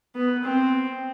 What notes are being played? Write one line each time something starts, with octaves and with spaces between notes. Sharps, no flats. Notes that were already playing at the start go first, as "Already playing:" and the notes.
B3
C4